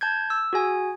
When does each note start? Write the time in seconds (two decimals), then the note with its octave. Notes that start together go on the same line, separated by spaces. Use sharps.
0.01 A5 G6 G#6
0.30 E6
0.53 F#4 G#4 G#5